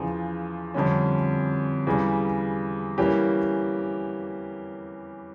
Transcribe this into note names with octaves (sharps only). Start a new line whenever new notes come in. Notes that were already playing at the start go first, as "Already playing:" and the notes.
Already playing: E2 C#3 F3
F2 D3 G3 C#4
E2 C#3 G3
E3 G3 A#3 C#4 G4